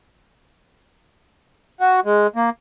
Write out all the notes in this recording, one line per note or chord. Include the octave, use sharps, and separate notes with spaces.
F#4
G#3
A#3